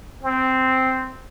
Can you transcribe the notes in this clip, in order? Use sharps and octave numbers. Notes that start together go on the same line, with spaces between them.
C4